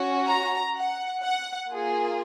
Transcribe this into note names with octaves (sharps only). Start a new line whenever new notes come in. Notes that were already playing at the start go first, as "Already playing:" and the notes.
Already playing: C#4 F#4
A#5
F#5
F#5
A#3 F4 G#4